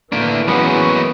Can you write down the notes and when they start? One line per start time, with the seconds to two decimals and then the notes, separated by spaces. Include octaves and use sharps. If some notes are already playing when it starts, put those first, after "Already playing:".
0.12 A2 E3 A3 A#3 D4
0.48 F#3 G#3 A#3 B3 C#4 F#4